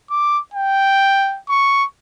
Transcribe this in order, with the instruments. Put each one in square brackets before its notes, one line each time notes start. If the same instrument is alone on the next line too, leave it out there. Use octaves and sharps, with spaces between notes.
[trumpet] D6
G5
C#6